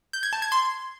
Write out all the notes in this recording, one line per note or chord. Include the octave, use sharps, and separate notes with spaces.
G6
G#6
A5
G#6
C6